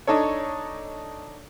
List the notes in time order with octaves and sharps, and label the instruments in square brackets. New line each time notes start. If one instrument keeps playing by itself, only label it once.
[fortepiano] D4 D#4 A4 C#5